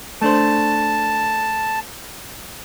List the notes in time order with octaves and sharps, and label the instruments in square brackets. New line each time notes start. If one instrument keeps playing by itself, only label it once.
[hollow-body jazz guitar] A3 D4 C5 [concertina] A5